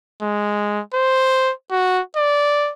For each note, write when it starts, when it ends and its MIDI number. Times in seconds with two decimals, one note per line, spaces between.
0.22 0.80 56
0.94 1.52 72
1.71 2.01 66
2.17 2.71 74